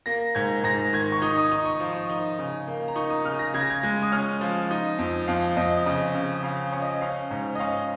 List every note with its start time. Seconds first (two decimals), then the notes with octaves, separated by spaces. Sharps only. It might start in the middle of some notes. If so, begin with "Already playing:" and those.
0.06 A#3 A#6
0.35 G#2 G#6
0.64 G#2 A#6
0.93 D#3 G#6
1.12 C#6
1.22 D#4 D#6
1.37 D#6
1.51 D#4 D#6
1.65 C#6
1.80 F3
2.09 D#4
2.39 C#3
2.67 A#3
2.88 A#5
2.96 D#4 C#6
3.10 D#6
3.25 C#3 F6
3.39 A#6
3.54 C#3 G#6
3.61 A#6
3.70 G#6
3.83 G#3 G#6
4.02 D#6
4.12 C#4 F6
4.41 F3
4.71 D#4
4.99 F2
5.28 F2 F5
5.57 F2 D#5
5.86 C#3 D#5
6.14 C#3
6.43 C#3 F5
6.72 C#4
6.82 D#5
7.01 C#4 F5
7.31 G#2
7.55 D#5
7.59 C#4 F5